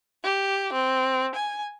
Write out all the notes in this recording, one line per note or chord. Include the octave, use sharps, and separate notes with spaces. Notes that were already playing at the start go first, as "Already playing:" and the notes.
G4
C4
G#5